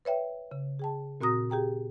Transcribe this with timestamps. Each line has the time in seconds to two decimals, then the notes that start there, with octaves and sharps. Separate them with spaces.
0.05 B4 C#5 E5 G5
0.51 C#3
0.79 G#4 G5 A5
1.21 A#2 C4 F#4 A#5 D#6 A#6
1.50 G4 G#4 G5 A#5